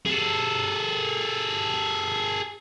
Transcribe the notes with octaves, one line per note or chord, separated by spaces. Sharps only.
G#4 A4